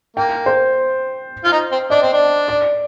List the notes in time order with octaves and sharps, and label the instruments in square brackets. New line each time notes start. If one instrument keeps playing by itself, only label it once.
[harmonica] A#3 [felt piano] G5
[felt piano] C5
[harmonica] F4
D#4
C4
[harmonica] D4 [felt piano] D#5
[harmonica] C4
D4
[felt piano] D5